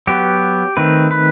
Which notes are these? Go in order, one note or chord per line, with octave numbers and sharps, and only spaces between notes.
F#3 B3 G4
D#3 A3 C4 B4
B4